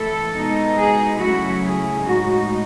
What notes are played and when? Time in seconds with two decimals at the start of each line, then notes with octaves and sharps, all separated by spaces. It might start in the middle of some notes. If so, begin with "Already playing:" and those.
Already playing: E3 A3 E4 A4
0.35 B2 G#3 D#4
0.78 G#4
1.19 C#3 F#3 A3 C#4 E4 F#4
1.63 G#4
2.05 A2 G#3 D#4 F#4